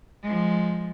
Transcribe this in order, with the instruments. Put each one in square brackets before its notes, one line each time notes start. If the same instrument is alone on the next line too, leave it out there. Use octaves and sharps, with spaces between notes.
[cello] F3 G#3